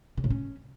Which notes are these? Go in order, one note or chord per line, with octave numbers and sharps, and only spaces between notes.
C#3
A2
C#4